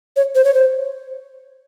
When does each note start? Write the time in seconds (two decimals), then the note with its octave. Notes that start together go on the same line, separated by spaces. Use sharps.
0.17 C#5
0.35 C5
0.44 C#5
0.54 C5